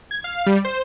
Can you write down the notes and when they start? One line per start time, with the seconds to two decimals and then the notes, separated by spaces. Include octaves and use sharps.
0.11 G#6
0.24 F5
0.46 G3
0.65 C5